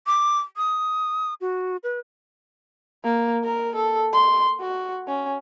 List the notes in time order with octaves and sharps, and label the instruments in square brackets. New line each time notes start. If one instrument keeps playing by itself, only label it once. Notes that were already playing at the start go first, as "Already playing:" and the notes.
[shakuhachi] D6
D#6
F#4
B4
[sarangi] A#3
A#4
A4
C6
F#4
C#4